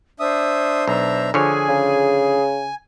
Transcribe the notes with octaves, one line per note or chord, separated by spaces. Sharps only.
D4 C5 E5 D#6
B1 D4 E5 A#5
D3 F3 G#4 C#5 G#5
C#3